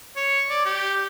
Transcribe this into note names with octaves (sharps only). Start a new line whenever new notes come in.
C#5
D5
G4